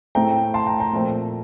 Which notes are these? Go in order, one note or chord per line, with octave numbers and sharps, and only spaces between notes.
A2 A3 C4 G5 A#5
A5 C6
G5 A#5
G5 A#5
A#2 F3 A3 C4